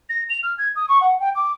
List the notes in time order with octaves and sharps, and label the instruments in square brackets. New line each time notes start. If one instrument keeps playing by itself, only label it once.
[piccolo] A#6
F7
F6
G#6
D#6
C#6
F#5
G5
D6